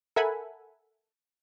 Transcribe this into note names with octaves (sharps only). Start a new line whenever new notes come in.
A4 A#4 E5 F#5 G#5 B5